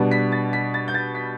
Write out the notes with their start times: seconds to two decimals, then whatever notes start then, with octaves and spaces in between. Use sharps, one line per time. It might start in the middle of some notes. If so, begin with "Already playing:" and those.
Already playing: B2 G3 B3 D4
0.11 B6
0.32 A6
0.53 B6
0.74 A6
0.88 G6
0.94 A6
1.15 B6